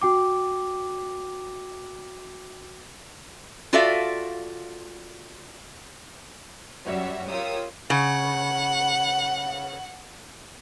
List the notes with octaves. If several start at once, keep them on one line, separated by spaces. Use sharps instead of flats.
F#4 G5 D6
F4 F#4 A4 D5 E5 F5
F#2 G3 F#4 C#5 E5
F4 G4 A#4 C#5 D#6 E6
C#3 F#5